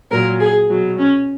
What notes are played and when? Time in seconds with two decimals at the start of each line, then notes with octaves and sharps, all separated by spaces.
0.12 A#2 F#3 A#4
0.40 G#4
0.70 B2 F#3
0.98 C#4